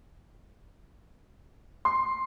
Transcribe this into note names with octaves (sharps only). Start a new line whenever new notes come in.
C6